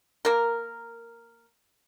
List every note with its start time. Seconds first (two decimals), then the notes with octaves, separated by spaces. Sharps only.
0.25 A#3 A#4